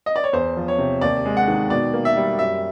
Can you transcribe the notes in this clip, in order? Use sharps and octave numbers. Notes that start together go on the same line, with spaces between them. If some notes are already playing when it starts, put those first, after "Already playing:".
D#5
D5
C#5
E2 C5
F3
C#5
C3
D#2 D5
G#3
F#5
D#3
B2 D5
A#3
E5
G3
F#2 E5